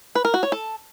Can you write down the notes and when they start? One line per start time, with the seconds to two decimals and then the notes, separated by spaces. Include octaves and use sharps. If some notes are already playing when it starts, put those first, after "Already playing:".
0.15 B4
0.25 A#4
0.34 F#4
0.43 C#5
0.52 A4